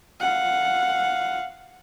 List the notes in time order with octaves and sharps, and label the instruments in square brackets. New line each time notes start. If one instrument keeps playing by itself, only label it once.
[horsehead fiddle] F5 F#5